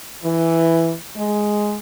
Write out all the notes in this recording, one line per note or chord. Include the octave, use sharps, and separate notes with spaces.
E3
G#3